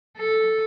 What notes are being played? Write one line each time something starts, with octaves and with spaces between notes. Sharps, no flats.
A4